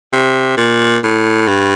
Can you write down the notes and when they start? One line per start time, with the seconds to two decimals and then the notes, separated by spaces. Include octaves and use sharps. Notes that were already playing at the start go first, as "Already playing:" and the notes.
0.13 C3
0.57 A#2
1.04 A2
1.48 G2